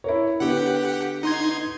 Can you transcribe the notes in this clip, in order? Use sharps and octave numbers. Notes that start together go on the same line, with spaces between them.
E4 A#4 C#5
D3 B3 G4 B4 F#5
D#4 C6 G#6